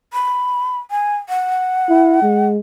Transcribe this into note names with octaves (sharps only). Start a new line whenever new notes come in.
B5
G#5
F#5
E4
G#3